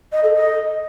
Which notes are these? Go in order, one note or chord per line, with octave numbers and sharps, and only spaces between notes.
D#5
A4
D#5